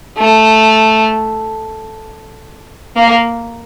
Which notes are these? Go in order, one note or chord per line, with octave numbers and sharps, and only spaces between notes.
A3
A#3